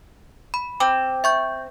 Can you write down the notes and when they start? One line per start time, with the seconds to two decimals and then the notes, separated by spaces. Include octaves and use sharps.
0.54 B5
0.80 C4 D6
1.24 E5 C#6 G6